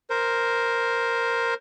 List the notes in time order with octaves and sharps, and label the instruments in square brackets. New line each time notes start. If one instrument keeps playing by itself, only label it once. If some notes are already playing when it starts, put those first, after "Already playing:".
[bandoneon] A#4 C5